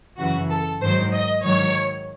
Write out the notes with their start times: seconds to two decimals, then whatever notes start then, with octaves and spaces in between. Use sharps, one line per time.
0.17 F#2 C#3 E3 F#4
0.49 A4
0.80 G#2 D#3 F#3 C5
1.12 D#5
1.43 G#2 D#3 F#3 C#5